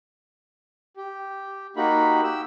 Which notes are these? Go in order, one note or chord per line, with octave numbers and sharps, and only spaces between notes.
G4
A#3 D#4 F#4 G4 B5
G4 E6